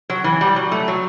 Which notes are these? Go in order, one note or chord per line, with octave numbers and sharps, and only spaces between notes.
F#3
E3
G3
F#3
A3
F#3